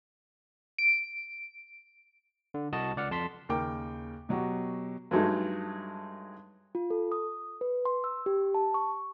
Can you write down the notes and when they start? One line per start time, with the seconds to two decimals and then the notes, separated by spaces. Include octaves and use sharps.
0.79 D7
2.54 D3
2.73 C2 F#4 D#5 A5
2.96 C#2 D5 F#5 F6
3.11 F2 A5 C6 B6
3.49 D#2 C#3 A#4 G5 D6
4.29 B2 F#3 F#4 G4
5.11 G2 F#3 G#3 A3 D#4
6.75 F4
6.90 A4
7.12 D#6
7.61 B4
7.85 C6
8.04 E6
8.26 G4
8.54 A5
8.74 C#6